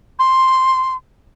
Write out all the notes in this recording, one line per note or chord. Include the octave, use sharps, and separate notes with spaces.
C6